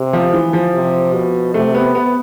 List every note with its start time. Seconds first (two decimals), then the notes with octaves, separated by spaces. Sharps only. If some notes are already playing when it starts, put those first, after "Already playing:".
Already playing: C3
0.13 F3
0.33 E3
0.53 F3
0.74 C3
1.13 B2
1.54 C3 A3
1.74 B3
1.95 B3